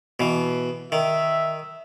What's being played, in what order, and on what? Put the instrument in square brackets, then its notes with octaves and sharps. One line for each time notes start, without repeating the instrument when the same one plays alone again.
[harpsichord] B2 E3
[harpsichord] D#3 [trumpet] E5